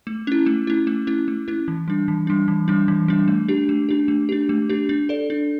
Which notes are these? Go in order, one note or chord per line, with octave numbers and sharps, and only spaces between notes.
A3
C#4 E4
A3
C#4 E4
A3
C#4 E4
A3
C#4 E4
E3
G3 D4
E3
G3 D4
E3
G3 D4
E3
G3 D4
A3
D4 G4
A3
D4 G4
A3
D4 G4
A3
D4 G4
D4
A4 D5
D4